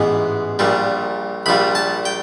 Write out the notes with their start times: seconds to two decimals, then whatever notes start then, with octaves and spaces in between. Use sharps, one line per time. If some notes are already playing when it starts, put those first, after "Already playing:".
Already playing: A1 G#2 E3 G#3 B3
0.59 A#1 A#2 G3
1.46 A#1 A#2 G3 B5
1.75 A5
2.05 G5